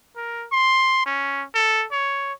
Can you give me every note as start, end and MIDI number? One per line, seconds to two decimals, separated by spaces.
0.16 0.46 70
0.52 1.03 84
1.06 1.44 61
1.54 1.86 69
1.92 2.33 73